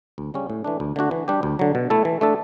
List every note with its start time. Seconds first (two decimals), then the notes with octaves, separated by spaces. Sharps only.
0.18 D2
0.34 C#3 G3 C#4 G4
0.50 A2
0.64 E3 A3 D4
0.80 D2
0.96 D3 A3 D4 F#4
1.11 E3
1.28 G3 D4 G4
1.43 D2
1.59 D3 F#3
1.75 B2
1.90 A3 E4 A4
2.05 E3
2.21 A3 D4 A4